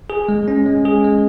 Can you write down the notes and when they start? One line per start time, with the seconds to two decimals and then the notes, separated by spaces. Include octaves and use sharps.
0.10 G#4
0.29 G#3
0.48 C#4
0.66 G#3
0.85 G#4
1.04 G#3